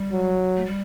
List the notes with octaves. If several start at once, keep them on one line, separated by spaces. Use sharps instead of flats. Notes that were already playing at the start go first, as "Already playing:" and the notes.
Already playing: G3
F#3
A3
G3